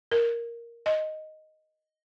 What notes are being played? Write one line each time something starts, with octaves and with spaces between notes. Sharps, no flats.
A#4
D#5